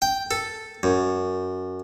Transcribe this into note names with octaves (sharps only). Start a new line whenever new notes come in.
G5
A4
F#2